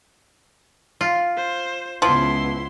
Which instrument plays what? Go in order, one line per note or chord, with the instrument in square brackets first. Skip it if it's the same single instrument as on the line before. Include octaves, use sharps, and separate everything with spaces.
[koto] F4
[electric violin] C5
[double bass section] C#2 B3 [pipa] F3 [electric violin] E4 C6